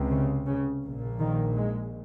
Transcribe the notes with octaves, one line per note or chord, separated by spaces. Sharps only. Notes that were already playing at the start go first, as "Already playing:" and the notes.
Already playing: C#2 C3
C#3
C#3
A#1 A#2
D#3
G#3